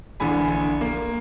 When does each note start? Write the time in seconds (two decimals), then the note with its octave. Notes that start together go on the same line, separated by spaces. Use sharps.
0.20 A#1 D3 E3 G#5 B5
0.81 A#3